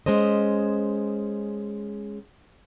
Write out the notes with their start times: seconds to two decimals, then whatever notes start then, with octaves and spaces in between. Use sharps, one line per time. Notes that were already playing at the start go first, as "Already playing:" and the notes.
0.06 G#3 C#4 C5 D#5